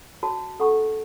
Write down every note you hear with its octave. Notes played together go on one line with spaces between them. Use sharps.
F#4 C#5 A5
C#4 A4 F#5 C#6